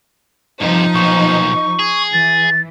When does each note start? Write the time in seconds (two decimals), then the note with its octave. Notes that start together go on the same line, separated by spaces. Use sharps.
0.61 G2 C3 F3 D#4
0.94 B1 A#2 C#6
1.79 G#4
2.13 E3 A6